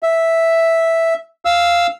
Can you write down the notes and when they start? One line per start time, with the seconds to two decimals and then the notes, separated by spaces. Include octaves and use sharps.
0.03 E5
1.45 F5 E6